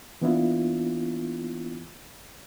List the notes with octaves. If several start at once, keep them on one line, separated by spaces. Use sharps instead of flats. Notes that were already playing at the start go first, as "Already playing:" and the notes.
E3 A#3 B3 D4 E4 F4